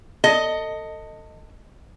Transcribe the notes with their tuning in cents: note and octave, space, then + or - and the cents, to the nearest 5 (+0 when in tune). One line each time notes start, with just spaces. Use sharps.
A4 +30 D#5 +0